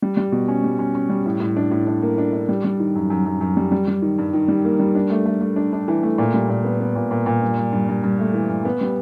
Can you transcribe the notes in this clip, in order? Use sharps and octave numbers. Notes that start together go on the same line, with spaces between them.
G3
G3
B2
C#4
G3
C#4
C#4
G3
A2
A2
D4
A2
D4
A#3
D4
D4
G3
G3
D#3
F#2
F#2
F#2
F#2
G3
G3
G3
D#3
G2
D#3
G3
A#3
G3
D4
A3
A3
A3
D4
D4
E3
A3
A#2
G3
A#2
B3
B3
A#2
A#2
A#2
G2
G2
G2
G2
G2
A3
E3
G2
B3
G3